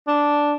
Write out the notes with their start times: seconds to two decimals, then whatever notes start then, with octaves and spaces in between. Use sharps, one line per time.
0.08 D4